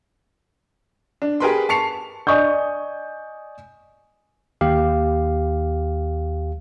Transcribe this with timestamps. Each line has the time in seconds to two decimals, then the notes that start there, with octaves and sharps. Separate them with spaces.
1.22 D4
1.40 G4 G#4 A#4 B4 B5 C6
1.69 A5 C#6 C7 C#7 F7
2.27 D5 D#5 G#5 C#6 D#6 G6
4.61 D#2 G4 F5